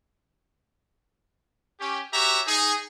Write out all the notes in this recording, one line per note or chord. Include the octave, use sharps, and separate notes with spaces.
C#4 G4
F#4 G4 C#5 E5 A#5
D#4 G#4